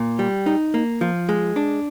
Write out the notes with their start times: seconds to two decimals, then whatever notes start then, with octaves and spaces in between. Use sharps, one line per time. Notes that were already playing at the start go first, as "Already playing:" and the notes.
Already playing: A#2
0.19 G3
0.46 D#4
0.74 A#3
1.01 F3
1.29 G#3
1.56 D4